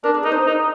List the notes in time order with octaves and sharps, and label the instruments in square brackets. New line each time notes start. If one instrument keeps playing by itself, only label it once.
[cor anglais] D4 [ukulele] A#4
[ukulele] G#4
[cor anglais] D#4 [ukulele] A#4
[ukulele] C5
[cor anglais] D#4